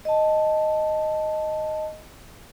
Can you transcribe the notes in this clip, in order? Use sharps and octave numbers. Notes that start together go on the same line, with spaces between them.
D#5 A5